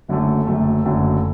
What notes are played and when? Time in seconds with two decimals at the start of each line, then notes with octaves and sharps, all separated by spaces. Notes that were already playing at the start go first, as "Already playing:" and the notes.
0.08 F#1 F#2 D3 F#3 A3
0.47 F#1 F#2 D3 F#3 A3
0.85 F#1 F#2 D3 F#3 A3